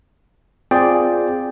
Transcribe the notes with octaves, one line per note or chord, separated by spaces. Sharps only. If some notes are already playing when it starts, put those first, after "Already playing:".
C4 F4 G#4 D5 G5